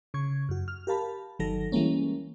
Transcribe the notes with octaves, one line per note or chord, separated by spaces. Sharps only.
C#3 C#6 G#6
F#2 F#4
F6
G4 A#4 F5 A5 B5
G1 D#3 F#3 A4 A#6
E3 G3 G#3 A#3 C#4